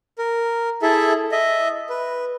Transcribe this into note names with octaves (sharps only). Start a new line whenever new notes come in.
A#4
E4 G#4 A4 E5
D#5 E5
B4